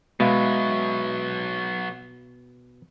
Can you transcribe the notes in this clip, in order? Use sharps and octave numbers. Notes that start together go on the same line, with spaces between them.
B2 F#3 G#3 B3 E5 F5